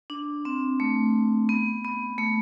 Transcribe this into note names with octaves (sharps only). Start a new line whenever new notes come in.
D4
C4
A3
B3
B3
A3